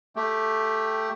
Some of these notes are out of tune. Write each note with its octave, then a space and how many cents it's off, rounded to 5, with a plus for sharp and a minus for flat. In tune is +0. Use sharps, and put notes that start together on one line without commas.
A3 +0 G4 +0 G5 +0